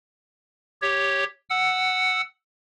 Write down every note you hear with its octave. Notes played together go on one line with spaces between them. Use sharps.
G4 C#5
F#5 E6